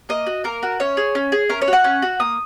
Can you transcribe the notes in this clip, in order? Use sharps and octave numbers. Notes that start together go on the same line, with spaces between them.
A#3 D#5
F#4
A#3 A#4
F#4
C#4 C#5
G#4
C#4
G#4
C#4 A#4
C#5
F#4
F#5
C#4
F#4
A#3 D#6